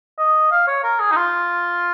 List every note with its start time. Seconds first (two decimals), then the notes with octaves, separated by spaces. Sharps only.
0.18 D#5
0.51 F5
0.67 C#5
0.84 A#4
1.00 G#4
1.12 D#4
1.16 F4